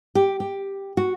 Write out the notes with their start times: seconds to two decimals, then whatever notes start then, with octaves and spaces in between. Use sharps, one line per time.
0.15 G4
0.40 G4
0.97 F#4